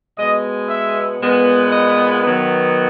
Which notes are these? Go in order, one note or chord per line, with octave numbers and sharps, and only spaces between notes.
B2 G#3 B3 D#5
E5
A#2 G#3 B3
D#5
D#3 F#3 B3